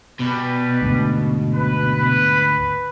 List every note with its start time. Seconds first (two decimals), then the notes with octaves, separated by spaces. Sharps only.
0.19 B2 G3 B4
0.82 D2 G#2
1.55 B4